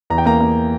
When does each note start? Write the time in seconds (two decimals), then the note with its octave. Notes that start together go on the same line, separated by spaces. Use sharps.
0.10 E2 A#5
0.18 G5
0.26 A#3 A#5
0.41 A#3